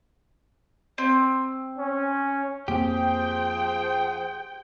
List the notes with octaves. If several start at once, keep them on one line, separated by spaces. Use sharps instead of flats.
C4
C#4
F2 F3 A#3 C4 G4 G#4 C5 G5